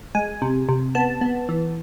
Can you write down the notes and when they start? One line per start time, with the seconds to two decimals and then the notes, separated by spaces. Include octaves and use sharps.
0.15 G#3 G#5
0.42 C3
0.69 C3
0.95 B3 A5
1.21 B3
1.49 E3